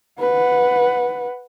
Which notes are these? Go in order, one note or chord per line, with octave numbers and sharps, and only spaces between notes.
B4 F#5